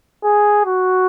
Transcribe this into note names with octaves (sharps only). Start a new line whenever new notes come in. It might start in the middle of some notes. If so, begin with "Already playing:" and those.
G#4
F#4